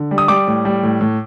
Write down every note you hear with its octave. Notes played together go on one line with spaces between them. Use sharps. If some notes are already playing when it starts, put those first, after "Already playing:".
Already playing: D3
G3
D#6
G3 D6
A2
G3
A2
A2